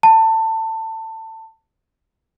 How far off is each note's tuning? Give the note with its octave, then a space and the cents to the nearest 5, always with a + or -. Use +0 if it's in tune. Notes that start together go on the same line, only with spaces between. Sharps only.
A5 +20